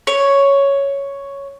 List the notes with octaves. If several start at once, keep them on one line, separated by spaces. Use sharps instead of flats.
C#5